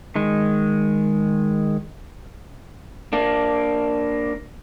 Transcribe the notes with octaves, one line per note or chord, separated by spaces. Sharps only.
D#3 G#3
A#3 D4